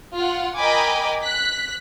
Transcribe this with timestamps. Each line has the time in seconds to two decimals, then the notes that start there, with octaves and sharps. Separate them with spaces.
0.15 F4 F#5
0.57 A#4 D#5 G5 G#5 B5 D6
1.23 F#6 B6